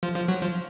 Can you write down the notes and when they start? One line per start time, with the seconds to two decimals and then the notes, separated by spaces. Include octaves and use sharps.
0.03 F3
0.16 F3
0.28 F#3
0.41 F3